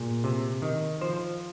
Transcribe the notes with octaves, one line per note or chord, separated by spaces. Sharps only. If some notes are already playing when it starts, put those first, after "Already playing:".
Already playing: A#2 G#4
C3
D#3
F3 C5